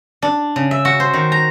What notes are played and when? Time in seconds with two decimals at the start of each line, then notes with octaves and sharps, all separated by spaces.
0.22 D4
0.56 C#3
0.71 E5
0.85 F#4
1.00 C5
1.14 D#3
1.32 A#5